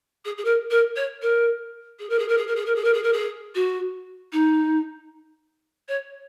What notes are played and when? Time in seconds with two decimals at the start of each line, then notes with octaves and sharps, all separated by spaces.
0.25 G#4
0.38 G#4
0.45 A#4
0.71 A#4
0.96 C#5
1.22 A#4
1.99 G#4
2.10 A#4
2.19 G#4
2.28 A#4
2.37 G#4
2.47 A#4
2.56 G#4
2.66 A#4
2.75 G#4
2.84 A#4
2.94 G#4
3.03 A#4
3.13 G#4
3.55 F#4
4.32 D#4
5.88 C#5